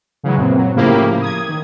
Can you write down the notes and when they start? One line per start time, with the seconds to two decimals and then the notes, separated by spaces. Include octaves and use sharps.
0.23 C#3 E3 F#3 G#3
0.37 F#2 A#2 E3 C4
0.57 F#3
0.76 A2 C#3 F3 A#3 E4 G4
1.22 D#6 G#6
1.49 D#3